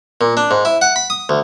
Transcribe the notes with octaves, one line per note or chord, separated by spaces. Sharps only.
A#2
D4
G#2
E4
F#5
B5
D#6
D2